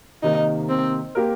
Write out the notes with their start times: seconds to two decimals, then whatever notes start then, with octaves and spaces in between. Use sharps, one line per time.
0.23 C3 D#3 A#3 D#4
0.69 C4
1.15 A#3 G4 A#4